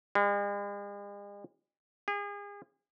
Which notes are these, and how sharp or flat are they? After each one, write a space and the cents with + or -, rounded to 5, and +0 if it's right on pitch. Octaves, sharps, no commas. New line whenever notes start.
G#3 -45
G#4 -35